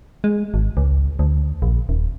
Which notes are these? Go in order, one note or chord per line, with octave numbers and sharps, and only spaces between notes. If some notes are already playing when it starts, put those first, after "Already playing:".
G#3
G#1
C#2
D2
A#1
D#1